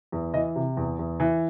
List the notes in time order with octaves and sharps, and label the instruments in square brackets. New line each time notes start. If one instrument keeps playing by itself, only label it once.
[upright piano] E2
E3 D#5
C3
E2
E2
E3